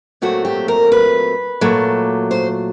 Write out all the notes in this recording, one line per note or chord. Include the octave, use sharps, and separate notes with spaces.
A#2 F#3 A3 C4 F#4
G4
A#4
B4
A#2 F#3 A3
C5